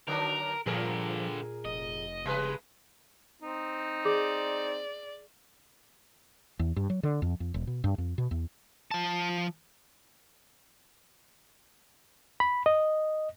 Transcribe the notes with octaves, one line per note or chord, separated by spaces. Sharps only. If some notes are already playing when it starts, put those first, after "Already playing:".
D3 F#3 D4 A#4
G2 A#2 D3 F3 G#4 A#4
F1 D#5
C#3 G3 G#3 B4
C4 D#4
G#4 D5
E2
G2
F#3
D3
F2
F2
E1
B2
G2
F2
B2
E2
F3 A5
B5
D#5